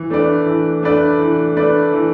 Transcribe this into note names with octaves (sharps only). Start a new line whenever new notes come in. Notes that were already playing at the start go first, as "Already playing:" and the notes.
Already playing: E3
A3 D4 B4 D5
E3
A3 D4 B4 D5
E3
A3 D4 B4 D5
E3